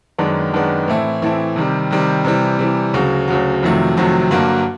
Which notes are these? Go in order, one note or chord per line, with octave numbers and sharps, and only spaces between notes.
F#2 D#3 G#3 B3 D4
F#2 D#3 G#3 B3 D4
A2 E3 A3 C4 E4
A2 E3 A3 C4 E4
C3 D#3 G3
C3 D#3 G3
C3 E3 G3
C3 E3 G3
D2 C#3 F#3
D2 C#3 F#3
F2 C3 D#3 F#3 A3
F2 C3 D#3 F#3 A3
G2 D3 F#3 A#3